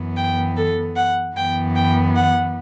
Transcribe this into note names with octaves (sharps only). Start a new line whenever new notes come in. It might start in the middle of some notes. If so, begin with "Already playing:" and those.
Already playing: F#2 E3 B3
G5
A4
F#5
F#2 E3 B3 G5
G5
F#5